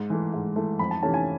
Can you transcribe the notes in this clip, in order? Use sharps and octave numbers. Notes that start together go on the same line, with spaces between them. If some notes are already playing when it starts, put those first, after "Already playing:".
Already playing: G#2
E3 A3
G#2
E3 A3
F2 B5
A5
C3 E3 A3 C#4 A5
G#5